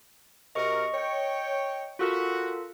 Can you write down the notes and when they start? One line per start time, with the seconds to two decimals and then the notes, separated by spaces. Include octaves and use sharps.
0.55 C3 F#4 A#4 D#5 C#6 C#7
0.94 C#5 G5
1.99 F4 F#4 A4 A#4